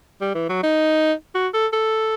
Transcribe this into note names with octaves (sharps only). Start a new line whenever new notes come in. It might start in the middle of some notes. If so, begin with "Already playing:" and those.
G3
E3
F#3
D#4
F#4
A4
A4